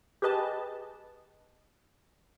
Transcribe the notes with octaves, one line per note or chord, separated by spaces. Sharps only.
G4 G#4 B4 D#5 A5